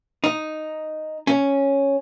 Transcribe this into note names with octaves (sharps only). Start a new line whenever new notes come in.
D#4
C#4